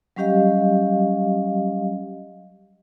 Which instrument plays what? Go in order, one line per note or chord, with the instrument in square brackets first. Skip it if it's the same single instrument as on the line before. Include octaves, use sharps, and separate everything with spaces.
[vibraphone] F#3 G3 C#4 G4 D#5 F5